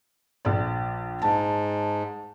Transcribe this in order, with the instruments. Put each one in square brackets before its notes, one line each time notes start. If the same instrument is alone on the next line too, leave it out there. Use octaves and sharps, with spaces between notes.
[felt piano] A#1 D5
[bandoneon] G#2 [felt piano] A5